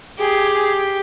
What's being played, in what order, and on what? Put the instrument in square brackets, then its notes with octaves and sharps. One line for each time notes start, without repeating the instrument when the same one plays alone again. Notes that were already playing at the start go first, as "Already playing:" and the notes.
[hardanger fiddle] G4 [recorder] G#4